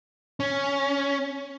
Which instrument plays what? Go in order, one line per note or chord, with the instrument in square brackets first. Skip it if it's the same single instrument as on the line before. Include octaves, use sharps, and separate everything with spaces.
[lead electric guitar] C#4